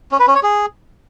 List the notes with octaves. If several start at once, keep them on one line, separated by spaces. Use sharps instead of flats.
C#4
B4
C#4
C#5
G#4